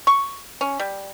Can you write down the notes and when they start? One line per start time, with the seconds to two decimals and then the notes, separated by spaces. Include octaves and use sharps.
0.07 C#6
0.61 C#4
0.80 G3